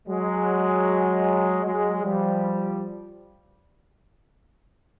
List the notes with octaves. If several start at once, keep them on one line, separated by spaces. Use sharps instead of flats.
F#3 G#3
F#3 G#3
F3 G3